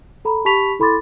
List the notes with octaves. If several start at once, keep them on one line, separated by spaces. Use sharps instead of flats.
A4 A#5 B5
G4 A5 B5 C#6 B6 F7
E4 A4 B5 C6 D6 A6